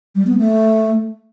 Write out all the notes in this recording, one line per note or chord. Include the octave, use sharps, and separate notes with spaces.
G3
B3
A3